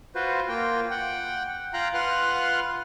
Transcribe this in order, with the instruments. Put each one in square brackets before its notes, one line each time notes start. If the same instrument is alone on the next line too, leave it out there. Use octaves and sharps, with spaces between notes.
[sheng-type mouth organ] F4 F#4 B4 C5
A#3 F4 G5
F#5 G5
F4 F5 G5 A#5 F#6
F4 B4 F#5 C6 F6 F#6